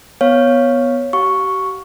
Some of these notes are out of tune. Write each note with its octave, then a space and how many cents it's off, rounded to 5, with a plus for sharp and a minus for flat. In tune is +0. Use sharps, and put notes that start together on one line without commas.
B3 +0 C#5 +0 F5 +0
G4 -40 F5 +35 C#6 +0